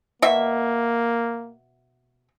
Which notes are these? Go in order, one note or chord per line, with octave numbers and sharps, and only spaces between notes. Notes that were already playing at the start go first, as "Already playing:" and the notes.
B2 A#3 E5